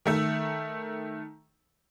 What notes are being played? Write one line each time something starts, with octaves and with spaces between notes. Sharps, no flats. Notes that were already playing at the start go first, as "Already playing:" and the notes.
D#3 A3 E5